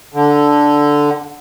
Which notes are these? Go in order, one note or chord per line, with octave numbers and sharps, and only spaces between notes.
D3